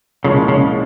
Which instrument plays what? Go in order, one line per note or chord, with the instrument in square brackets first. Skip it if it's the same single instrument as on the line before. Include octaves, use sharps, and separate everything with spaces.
[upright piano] C2 A#2 F3 G#3 C#4 [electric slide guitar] C#3
[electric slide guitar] C#3